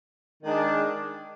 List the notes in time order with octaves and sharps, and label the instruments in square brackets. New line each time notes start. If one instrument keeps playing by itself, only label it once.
[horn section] D#3 G#3 D4